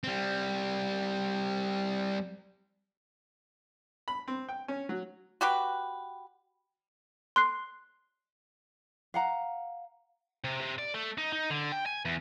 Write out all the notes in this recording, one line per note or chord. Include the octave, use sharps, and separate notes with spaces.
G3 C4
B5
C4
G5
C#4
F#3
F#4 G4 B4
C6 F#6 C7
F5 F#5 A#5
C3
C3
D5
A3
D#4
D#4
D3
G5
G#5
E2